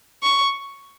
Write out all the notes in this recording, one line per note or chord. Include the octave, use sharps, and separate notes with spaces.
C#6